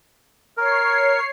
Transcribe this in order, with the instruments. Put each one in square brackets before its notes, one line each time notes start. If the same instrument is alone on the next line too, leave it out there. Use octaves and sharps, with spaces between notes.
[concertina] A#4 [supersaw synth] C#5 C7